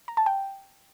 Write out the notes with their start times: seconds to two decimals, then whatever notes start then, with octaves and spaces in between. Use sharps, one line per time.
0.08 A#5
0.17 A5
0.26 G5